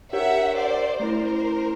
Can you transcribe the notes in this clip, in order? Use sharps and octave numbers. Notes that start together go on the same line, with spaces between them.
D4 G4 A#4 C#5 E5 F#5
C5 D5
A3 C#4 E4 A#4 C5